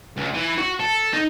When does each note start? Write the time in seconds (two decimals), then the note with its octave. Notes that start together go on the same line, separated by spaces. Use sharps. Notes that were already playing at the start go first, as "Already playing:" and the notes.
0.17 C#2
0.34 E3
0.58 F#4
0.80 A4
1.13 D#4